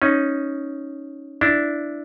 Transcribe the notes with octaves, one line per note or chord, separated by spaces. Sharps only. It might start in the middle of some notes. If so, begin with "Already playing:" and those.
C#4 D#4
D4 E4